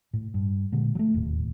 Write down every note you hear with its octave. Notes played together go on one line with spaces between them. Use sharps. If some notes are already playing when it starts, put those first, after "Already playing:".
A2
G2
A#2 D3 G#3
F#3 A3
E1 D#2 A2